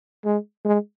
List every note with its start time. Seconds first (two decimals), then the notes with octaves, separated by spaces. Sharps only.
0.25 G#3
0.65 G#3